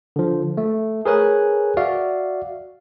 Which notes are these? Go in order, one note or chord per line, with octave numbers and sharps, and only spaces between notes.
D3 F3
A3
G#4 A#4 B4 C#5 G#5 F#6
F#4 D5 E5 F5